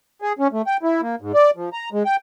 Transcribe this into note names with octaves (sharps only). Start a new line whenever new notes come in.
G#4
C#4
A3
G5
E4
A#3
G#2
D5
F3
A#5
G#3
G5